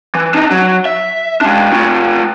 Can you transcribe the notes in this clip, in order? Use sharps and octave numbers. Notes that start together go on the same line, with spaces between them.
E3
D4 D#4
F#3
E5
G#3 D4
A3 F4